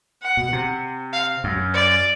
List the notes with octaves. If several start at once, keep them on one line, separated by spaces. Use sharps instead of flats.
F#5
B2
C3
F5
F#2
D5